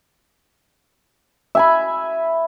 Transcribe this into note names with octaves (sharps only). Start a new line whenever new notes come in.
E5 G#5 B5